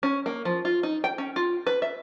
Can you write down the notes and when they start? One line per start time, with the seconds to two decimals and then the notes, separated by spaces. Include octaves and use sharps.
0.03 C#4
0.26 A#3
0.45 F3
0.65 F4
0.83 D#4
1.04 G5
1.18 C#4
1.36 F4
1.67 B4
1.82 E5